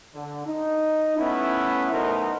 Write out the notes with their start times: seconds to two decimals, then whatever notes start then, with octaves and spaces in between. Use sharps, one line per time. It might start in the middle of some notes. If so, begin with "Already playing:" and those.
0.14 D3
0.46 D#4
1.17 A3 B3 C#4 E4
1.92 F#2 B2 A3 D#4 A#4 C5